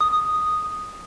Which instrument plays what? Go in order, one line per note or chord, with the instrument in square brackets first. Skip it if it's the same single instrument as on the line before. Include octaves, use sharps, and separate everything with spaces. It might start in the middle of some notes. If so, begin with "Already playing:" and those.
[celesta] D#6